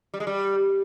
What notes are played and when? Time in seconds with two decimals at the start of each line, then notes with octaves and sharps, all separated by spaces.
0.14 G3
0.20 G#3
0.27 G3